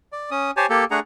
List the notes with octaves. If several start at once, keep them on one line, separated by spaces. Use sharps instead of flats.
D5
C#4 D#6
G4 C5 C#5 G#5 A5
A#3 G4 A4
A3 D4 G#4 F#5 A#5